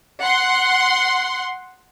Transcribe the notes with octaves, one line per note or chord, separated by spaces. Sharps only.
F#5 C6